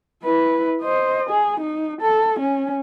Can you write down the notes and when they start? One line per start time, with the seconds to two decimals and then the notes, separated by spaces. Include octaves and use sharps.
0.23 E4 B4
0.82 C5 D#5
1.30 G#4
1.60 D#4
2.01 A4
2.40 C#4